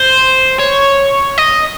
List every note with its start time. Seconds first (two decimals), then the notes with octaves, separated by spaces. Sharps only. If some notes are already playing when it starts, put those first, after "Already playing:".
Already playing: C5
0.59 C#5
1.38 D#5